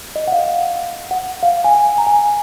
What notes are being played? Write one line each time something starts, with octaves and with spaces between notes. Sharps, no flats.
D#5
F#5
F5
F#5
F5
G#5
G#5
A#5
G#5